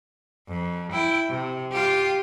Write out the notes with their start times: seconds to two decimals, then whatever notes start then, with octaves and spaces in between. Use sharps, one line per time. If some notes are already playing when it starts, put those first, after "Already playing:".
0.48 F2
0.92 E4 G5
1.29 C3
1.72 F4 G4